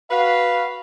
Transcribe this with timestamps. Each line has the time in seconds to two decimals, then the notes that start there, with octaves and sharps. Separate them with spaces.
0.11 F#4 B4 F5